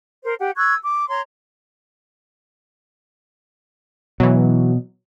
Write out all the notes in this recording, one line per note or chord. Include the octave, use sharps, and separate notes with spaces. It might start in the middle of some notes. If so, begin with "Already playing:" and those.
A#4 C5
G4 F#5
C#6 E6 F#6 G#6
D6
C#5 A#5 C6
B2 E3 F#3